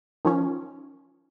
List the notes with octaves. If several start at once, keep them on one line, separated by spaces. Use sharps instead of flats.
D#3 F3 C#4